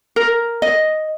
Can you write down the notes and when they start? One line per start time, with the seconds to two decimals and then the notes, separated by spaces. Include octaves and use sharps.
0.16 A#4
0.62 D#5